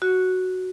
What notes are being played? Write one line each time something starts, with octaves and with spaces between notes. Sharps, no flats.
F#4